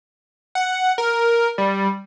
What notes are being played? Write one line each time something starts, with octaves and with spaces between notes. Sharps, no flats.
F#5
A#4
G3